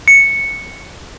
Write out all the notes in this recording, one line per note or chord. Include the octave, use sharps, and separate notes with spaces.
C#7